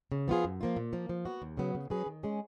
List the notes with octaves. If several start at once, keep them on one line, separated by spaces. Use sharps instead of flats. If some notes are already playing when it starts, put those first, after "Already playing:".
C#3
F3 B3 F4 G#4
F#2
F3 A#3 F4
A#2
F3 A#3
F3
B3 F#4
D#2
C#3 F#3 B3
C#3
F#3 C#4 G#4 B4
D#3
G#3 C#4 G#4